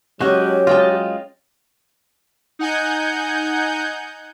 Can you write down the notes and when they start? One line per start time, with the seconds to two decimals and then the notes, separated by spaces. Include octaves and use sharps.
0.21 F#3 G#3 C#4 F#4 G4 D#5
0.67 G#3 F4 D#5 G5 A5
2.59 D#4 F#5 G#5 G6